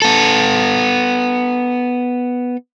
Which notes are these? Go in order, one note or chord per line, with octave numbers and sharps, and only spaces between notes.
B3 A4